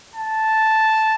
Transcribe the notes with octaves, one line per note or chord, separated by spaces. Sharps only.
A5